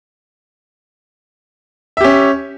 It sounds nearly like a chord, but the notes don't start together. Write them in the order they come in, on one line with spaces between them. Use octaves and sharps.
E5 G4 C#4